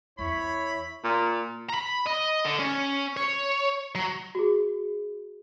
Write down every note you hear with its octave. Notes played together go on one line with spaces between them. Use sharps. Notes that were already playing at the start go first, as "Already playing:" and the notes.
E2 C4 E4 C#5 B5
A#2
A#5 B5
D#5
D3
C#4
C#5
F#3
F#4 G#4